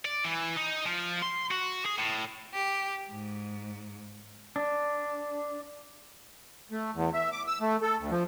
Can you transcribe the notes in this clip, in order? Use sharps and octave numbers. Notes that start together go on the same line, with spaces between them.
D5
E3
D#4
F3
C6
F#4
G#4
A2
G4
G#2
D4
A3
E2
E5
D6
E6
A3
A4
D2
F3